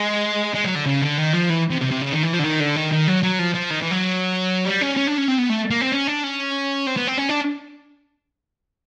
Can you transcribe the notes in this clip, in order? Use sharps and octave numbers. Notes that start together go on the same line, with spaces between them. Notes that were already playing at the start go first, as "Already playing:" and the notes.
Already playing: G#3
G#3
F#3
D3
C#3
D3
D#3
F3
E3
C3
C3
C3
C#3
D#3
E3
F3
D3
D#3
D3
D#3
D#3
F#3
F#3
F3
F3
D#3
E3
F#3
G3
C#4
C#4
D4
C#4
C4
B3
A3
A#3
C4
C#4
D4
C#4
C4
B3
C4
C#4
D4